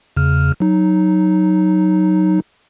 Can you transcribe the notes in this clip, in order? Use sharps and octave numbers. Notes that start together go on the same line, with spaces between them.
E2 C#3 F6
F#3 D#4